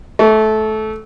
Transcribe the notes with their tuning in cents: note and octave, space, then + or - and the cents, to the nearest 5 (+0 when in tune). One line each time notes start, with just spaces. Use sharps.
A3 -20 C#6 +25